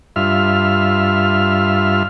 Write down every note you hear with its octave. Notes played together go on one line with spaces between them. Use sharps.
G2 F4 E5 F6